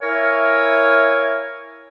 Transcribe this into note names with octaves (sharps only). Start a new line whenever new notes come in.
E4 A#4 C#5 E5 F5 G#5